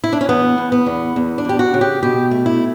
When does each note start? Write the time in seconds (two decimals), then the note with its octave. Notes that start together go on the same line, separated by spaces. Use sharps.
0.04 E4
0.13 D4
0.21 C#4
0.29 E2 B3
0.58 E2
0.72 B3
0.86 E2
1.16 E2
1.38 D4
1.45 E2 G4
1.59 F#4
1.74 C#3
1.81 G4
2.03 B2 G4
2.31 A3
2.46 E4